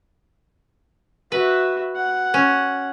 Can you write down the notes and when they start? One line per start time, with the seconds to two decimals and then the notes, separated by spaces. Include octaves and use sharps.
1.32 F#4 B4 E5
1.95 F#5
2.34 C#4